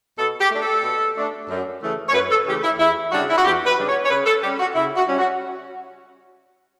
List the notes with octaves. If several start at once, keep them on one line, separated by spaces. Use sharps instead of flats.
B2 A4
G4
A3 D4
A4
B2
A3 D4
F#2
C#3 E3 A3
C#5
F#2 B4
A4
C#3 E3 A3 G4
E4
E2 E4
C#3 G3 D4 F#4
E4
F#4
E2 G4
B4
C#3 G3 D4
C#5
C#5
C#3 B4
A4
G3 C#4 G4
F#4
C#3 E4
F#4
G3 C#4
F#4